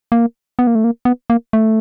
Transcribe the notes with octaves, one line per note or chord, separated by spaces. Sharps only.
A#3
B3
A#3
A3
A#3
B3
A#3
A3